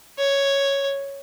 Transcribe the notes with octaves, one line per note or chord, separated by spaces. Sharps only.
C#5